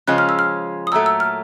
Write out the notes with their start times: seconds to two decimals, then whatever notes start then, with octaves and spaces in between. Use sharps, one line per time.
0.08 C#3 F3 G#3 C#4 F4 F#6
0.18 F6
0.29 E6
0.39 F6
0.87 D#6
0.92 A#2 F#3 A3 E6
1.06 E6
1.20 F6